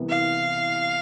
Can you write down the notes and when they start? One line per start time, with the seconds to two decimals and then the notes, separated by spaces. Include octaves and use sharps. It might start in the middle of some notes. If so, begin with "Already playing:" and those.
Already playing: C2 C3 E3 B3
0.10 F5